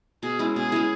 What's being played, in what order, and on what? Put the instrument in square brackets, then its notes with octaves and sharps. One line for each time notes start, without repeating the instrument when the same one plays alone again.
[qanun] B2 [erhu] G#4
[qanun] G#3 C#4 E4
[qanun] B2 [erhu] G#4
[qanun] G#3 C#4 E4